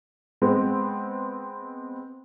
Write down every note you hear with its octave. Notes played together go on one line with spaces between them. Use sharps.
G#3 B3 C4